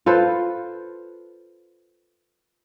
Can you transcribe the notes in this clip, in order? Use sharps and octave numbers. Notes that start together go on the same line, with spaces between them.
F4 A4 B4 C5